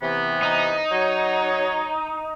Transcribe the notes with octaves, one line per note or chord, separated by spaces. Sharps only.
C3 E3 B3
D#4
F#3 C#5